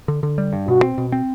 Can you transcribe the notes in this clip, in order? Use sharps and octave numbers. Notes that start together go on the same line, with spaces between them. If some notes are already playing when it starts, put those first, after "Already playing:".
D3
D3
G3
G2
B2 F#4
C4
B2
C4